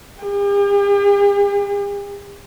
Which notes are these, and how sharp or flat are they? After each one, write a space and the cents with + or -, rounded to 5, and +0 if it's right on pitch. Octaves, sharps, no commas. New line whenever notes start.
G4 +45